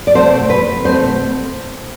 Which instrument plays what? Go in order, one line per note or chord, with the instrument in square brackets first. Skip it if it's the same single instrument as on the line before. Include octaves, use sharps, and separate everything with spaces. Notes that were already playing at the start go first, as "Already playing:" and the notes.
[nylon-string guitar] D5
B2 A3 C4 C5
B4
B2 A3 C4 C5